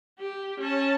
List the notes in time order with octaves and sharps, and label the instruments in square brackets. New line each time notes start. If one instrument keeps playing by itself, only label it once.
[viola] G4
C#4 A5